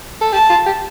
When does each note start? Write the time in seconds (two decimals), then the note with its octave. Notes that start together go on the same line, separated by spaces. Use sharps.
0.21 A4
0.33 G4 A5
0.50 F4
0.66 G4